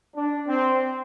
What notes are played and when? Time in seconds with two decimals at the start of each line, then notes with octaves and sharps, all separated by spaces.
0.15 D4
0.48 C4